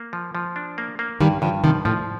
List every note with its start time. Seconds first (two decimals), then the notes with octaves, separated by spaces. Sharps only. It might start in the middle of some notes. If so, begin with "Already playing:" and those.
Already playing: A#3
0.13 F3
0.35 F3
0.56 D4
0.78 A#3
0.99 A#3
1.21 G2 D#3 G3
1.42 G2 D3 F3
1.64 C3 D#3 F3
1.85 A2 F3